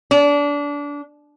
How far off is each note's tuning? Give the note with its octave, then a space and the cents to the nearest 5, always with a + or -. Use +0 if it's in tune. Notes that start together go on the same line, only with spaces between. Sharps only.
D4 -25